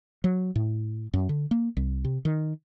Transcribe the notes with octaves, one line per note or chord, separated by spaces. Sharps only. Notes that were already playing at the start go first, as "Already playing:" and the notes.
F#3
A2
F#2
D3
A#3
C2
C3
D#3